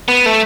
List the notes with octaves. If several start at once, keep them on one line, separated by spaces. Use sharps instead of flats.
B3
A3